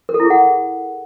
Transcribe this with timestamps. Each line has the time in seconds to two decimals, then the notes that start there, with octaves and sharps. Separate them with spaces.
0.09 A#4
0.14 A4
0.20 E4
0.25 G#4
0.30 F#5